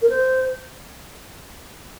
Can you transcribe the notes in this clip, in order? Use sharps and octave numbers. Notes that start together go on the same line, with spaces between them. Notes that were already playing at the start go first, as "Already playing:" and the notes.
A#4
C5